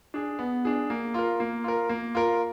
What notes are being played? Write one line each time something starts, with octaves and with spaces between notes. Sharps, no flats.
D4 G#4
B3
D4 G#4
A#3
F4 A#4
A#3
F4 A#4
A#3
F4 A#4